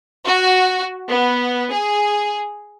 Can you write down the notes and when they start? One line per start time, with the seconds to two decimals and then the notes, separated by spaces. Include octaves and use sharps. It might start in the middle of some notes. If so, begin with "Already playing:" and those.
0.26 F#4
1.09 B3
1.70 G#4